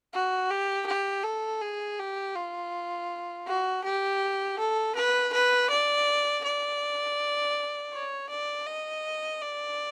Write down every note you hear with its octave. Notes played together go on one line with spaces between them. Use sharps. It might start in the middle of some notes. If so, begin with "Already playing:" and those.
F#4
G4
G4
A4
G#4
G4
F4
F#4
G4
A4
B4
B4
D5
D5
C#5
D5
D#5
D5